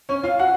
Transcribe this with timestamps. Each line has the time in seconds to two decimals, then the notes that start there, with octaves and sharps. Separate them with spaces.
0.09 C#4 C#5
0.23 F4 F5
0.39 F#4 F#5